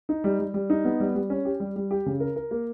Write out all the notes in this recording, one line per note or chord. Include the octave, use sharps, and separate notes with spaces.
D#4
G3
G3
G3
D#4
B3
G3
G3
C#4
G4
G3
G3
G4
C#3
A#4
A#4
A#3